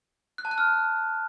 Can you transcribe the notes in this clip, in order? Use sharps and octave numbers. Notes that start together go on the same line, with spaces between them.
F#6
A5
F#6
F6